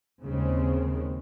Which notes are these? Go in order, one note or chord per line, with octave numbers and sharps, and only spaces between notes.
D#2 C#3 G#3 C4